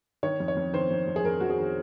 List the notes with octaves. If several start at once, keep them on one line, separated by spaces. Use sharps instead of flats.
D#3 C#5
F2
C#5
F2
D#3 C5
F2
F2
G#4
F2 A#4
F2 F#4
G#4
D#3